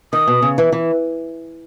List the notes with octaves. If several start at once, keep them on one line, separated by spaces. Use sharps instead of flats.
D#3 D#6
B2
C#3
E3
E3